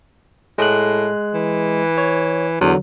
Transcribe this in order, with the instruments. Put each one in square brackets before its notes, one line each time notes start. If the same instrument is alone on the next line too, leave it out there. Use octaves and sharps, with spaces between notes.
[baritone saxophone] A2 [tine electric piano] G#3 F#6
[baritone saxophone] E3
[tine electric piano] C#5
[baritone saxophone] E2 [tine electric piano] D3 F#3